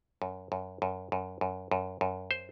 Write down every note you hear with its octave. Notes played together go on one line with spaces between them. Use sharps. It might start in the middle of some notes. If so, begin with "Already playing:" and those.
F#2
F#2
F#2
F#2
F#2
F#2
F#2
C5